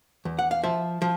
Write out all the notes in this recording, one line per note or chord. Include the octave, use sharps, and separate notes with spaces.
E2
F#5
F5
F3 E5
F3